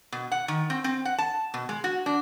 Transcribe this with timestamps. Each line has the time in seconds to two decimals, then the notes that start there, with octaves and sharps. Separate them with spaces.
0.12 B2
0.32 F#5
0.48 D#3
0.70 C4
0.84 C4
1.05 F#5
1.18 A5
1.54 B2
1.69 G#3
1.84 F#4
2.06 D4